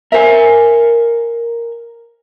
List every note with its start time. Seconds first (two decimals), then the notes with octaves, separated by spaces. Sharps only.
0.12 A#4 C5 E5 G#5